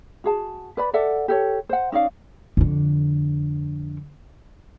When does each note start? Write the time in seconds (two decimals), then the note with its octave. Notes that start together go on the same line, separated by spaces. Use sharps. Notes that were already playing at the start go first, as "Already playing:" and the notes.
0.24 F#4 G#4 A5
0.77 B4 D5 B5
0.93 A4 D5 E5 F#5
1.28 G4 A4 C#5
1.69 C5 F#5
1.92 C#4 D#4 D5 F5
2.57 F2 D3